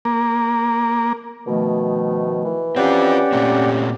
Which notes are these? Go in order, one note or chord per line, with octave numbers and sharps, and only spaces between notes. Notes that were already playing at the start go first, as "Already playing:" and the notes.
A#3
B2 D#3 F3 A3
E3
C4 C#4 F4 G4 D5 F#5 G5
A#2 A3 C4